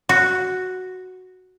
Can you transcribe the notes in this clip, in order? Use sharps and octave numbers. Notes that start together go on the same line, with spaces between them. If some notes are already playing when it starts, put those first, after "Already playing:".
F#4